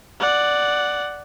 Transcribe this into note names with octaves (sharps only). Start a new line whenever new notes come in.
D5 F#5